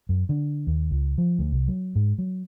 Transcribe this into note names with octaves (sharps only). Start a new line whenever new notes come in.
F#2
D3
D#2
C#2
F3
D2
C2
F#3
G#2
F#3